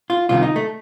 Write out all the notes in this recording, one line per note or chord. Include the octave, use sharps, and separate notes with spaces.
F4
C2 C3 D#3 F4
D#4
A3